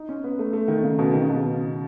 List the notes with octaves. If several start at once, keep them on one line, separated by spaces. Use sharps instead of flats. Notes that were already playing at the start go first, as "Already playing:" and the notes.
Already playing: D#4
C#4
B3
A3
A3
D#3
C#3
B2
D#3
C#3
B2
C#3